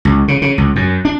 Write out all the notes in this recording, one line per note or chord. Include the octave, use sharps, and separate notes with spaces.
C#2
C#3
C#3
C#2
F#2
D4